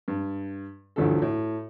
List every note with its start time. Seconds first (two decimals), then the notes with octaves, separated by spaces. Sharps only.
0.08 G2
0.96 A1 D2 G2 A#2 F3 A4
1.22 A2